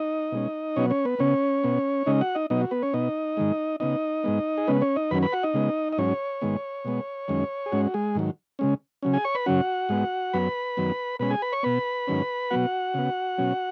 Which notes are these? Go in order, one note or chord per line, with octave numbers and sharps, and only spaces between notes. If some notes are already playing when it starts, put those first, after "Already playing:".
Already playing: D#4 D#5
B2 G#3 C#4
B2 F#3 B3 C#4 C#5
C#4 C#5
B3 B4
C#3 B3 C#4 C#5
B2 B3
C#3 G#3 C#4 D#4 D#5
F#4 F#5
D#4 D#5
B2 F#3 B3 D#4 D#5
F#4
B3 B4
C#4 C#5
B2 B3 D#4 D#5
G#2 D#3 G#3
C#3 B3 D#4 D#5
G#2 G#3 B3
G#4
C#3 G#3 B3 C#4 B4
C#4 C#5
D#4 D#5
F#2 D#3 F#3 C#4 B4 B5
B4 B5
F#4 F#5
D#4 D#5
C#3 G#3 B3
D#5
G#2 F#3 C#4 C#5
G#2 D#3 G#3 B3
B2 G#3 B3
F#2 D#3 G#3 C#4
G#4
G#2 G#3 C#4 F#4
G#3 G#4
G#2 D#3 F#3
C#3 G#3 C#4
C#3 F#3 C#4
G#4 G#5
C#5 C#6
B4 B5
F#2 C#3 F#3 C#4 F#4 F#5
G#2 G#3 B3
F#2 F#3 B3 B4 B5
F#2 D#3 F#3 B3
B2 G#3 C#4 B4 B5
G#4 G#5
B4 B5
C#5 C#6
B2 B3 B4 B5
G#2 D#3 F#3 C#4
B2 F#3 B3 F#4 F#5
C#3 B3
B2 F#3 C#4